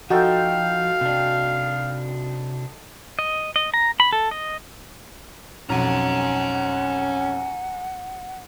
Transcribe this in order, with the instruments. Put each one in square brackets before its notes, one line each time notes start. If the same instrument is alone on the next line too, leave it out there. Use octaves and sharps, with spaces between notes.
[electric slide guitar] F3 [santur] D#4 A4 G5 [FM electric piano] F#4 [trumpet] F5
[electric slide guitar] C3 D4
[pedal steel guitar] D#5
D#5
A#5
B5
A4
D#5
[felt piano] B1 F2 [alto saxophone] C#4 [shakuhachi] F#5 [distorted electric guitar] G#5 A#5